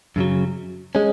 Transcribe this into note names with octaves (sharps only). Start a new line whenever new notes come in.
F#2 C#3 F#3
G#3 C#4